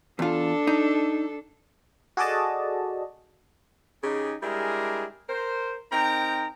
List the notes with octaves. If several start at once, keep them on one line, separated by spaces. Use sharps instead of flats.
E2 D4 F4 A4
D#4
F#4 G#4 A4 D5 D#5 A5
C#3 D#4 G4 G#4
G3 G#3 D4 E4 G#4 A#4
A#4 C5
C4 D#4 A#4 G5 A#5